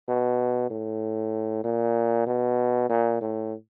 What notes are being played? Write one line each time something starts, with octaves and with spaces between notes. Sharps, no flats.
B2
A2
A#2
B2
A#2
A2